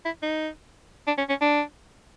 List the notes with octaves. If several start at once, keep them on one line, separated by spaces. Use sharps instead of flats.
E4
D#4
D4
C#4
C#4
D4